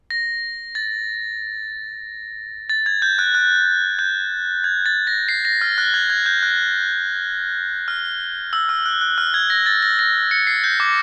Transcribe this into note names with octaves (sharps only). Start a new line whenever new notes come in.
A#6
A6
A6
G#6
G6
F#6
F#6
G6
G#6
A6
A#6
C7
A#6
F6
F#6
G#6
G#6
G6
F#6
F6
E6
F6
F#6
F#6
F6
G#6
A#6
A6
A#6
A#6
C#7
C7
G6
D6